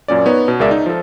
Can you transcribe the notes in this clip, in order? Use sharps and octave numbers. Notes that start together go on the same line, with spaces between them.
F#2 A#2 C#4 D5
B3 D#4 B4 C#5
B2
C#2 G#4 A#4 D5 E5
D#4
F3 A4